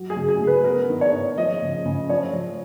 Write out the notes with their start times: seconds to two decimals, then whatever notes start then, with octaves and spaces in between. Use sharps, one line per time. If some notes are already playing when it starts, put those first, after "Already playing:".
Already playing: F#3
0.10 G#4
0.16 C#3
0.29 G#4
0.41 C#3
0.47 B4
0.64 B3 A#4
0.89 D#3
1.01 C#5
1.13 D#3
1.38 F3 D#5
1.62 C#3
1.86 C#3
2.09 F3 C#5
2.33 F3